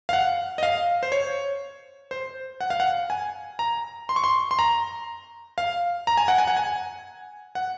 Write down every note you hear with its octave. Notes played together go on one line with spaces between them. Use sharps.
F5
F#5
D#5
F5
C5
C#5
C5
F#5
F5
F#5
G#5
A#5
C6
C#6
C6
C6
A#5
F5
A#5
G#5
F#5
G#5
F#5
G#5
F#5